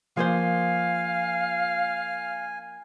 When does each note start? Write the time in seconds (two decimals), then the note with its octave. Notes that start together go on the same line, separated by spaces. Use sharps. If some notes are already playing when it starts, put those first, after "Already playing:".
0.17 F3 A#3 C5 F5 G#5